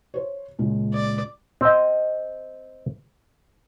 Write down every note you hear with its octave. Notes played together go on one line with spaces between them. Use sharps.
C5 C#5
C#2 A#2 C#3
D5
C4 D#5